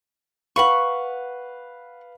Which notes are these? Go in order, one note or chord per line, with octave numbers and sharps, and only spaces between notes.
B4 F5 F#5 B5 C#6